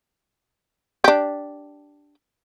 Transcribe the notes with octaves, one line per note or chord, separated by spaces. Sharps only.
D4 G4